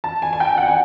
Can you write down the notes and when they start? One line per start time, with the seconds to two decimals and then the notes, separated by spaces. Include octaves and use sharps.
0.04 A5
0.22 G#5
0.33 G#5
0.40 G5
0.58 F#5
0.68 G#5